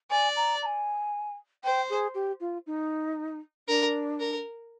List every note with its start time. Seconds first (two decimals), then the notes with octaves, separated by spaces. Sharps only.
0.10 D5 G#5
0.36 A#5
0.62 A#5
0.66 G#5
1.64 C5 G5
1.90 G#4
2.14 G4
2.40 F4
2.66 D#4
3.68 D4 A#4
4.20 A#4